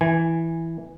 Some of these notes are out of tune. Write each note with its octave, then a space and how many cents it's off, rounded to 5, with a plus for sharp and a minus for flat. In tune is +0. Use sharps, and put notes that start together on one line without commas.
E3 +0 G#5 -5